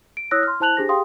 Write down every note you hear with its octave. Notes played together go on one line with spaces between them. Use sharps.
D7
E4 C#5 D#6 E6 F#6 A#6
C6 F6
E4 C5 A5 F#6 F7 F#7
D4 G4 G#4 C5 A#6
G4 G#4 F5 G5 C6 D#6